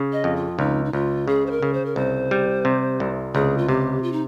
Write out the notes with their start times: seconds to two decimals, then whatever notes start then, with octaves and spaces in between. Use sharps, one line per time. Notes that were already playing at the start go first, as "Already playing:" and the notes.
Already playing: C#3
0.13 D#5
0.24 F2
0.36 F4
0.59 C#2 D#4
0.85 D#4
0.93 C#2 F4
1.28 C#3 G#4
1.46 C5
1.51 A#4
1.62 C#3
1.73 C5
1.86 A#4
1.96 C2 C5
2.31 G3
2.65 C3
3.00 C2
3.35 C#2 G#4
3.58 F4
3.68 C3 G4
4.03 F4
4.13 D#4